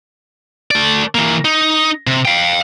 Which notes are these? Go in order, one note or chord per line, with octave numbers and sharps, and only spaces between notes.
A3 D5
E3 A#3
D#4
C3
F5 G5